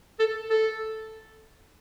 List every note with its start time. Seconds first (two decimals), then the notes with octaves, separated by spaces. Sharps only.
0.20 A4
0.50 A4